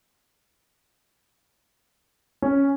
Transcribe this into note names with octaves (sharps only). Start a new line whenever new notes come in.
C#4